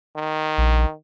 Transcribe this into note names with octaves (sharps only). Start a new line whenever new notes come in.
D#3
A#1